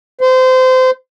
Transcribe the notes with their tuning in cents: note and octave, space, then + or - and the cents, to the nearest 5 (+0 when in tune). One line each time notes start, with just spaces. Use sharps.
C5 -25